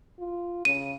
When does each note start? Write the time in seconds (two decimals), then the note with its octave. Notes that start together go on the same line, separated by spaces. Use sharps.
0.19 F4
0.65 C#3 D#7